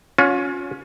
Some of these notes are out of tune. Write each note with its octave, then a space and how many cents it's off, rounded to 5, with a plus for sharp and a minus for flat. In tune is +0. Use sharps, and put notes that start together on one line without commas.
C#4 +15 F4 +40